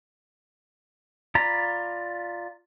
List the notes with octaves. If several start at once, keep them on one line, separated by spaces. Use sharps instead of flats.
F4 D5 A#5 B5